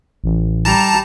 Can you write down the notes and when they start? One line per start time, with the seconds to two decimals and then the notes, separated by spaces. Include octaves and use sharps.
0.24 A1
0.65 G3 A5 A#5